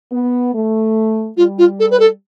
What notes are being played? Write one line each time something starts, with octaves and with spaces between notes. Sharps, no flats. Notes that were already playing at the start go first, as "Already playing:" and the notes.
B3
A3
G3 F4
F4
A4
B4
A4